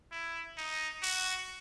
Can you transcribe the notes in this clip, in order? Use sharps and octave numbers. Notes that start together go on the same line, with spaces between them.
E4
D#4
F#4